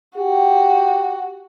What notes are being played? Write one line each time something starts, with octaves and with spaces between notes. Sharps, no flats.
F#4 G4